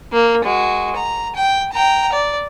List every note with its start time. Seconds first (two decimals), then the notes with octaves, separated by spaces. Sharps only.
0.13 A#3
0.44 G#3 F#4
0.96 A#5
1.36 G5
1.73 G5 A#5
2.12 D5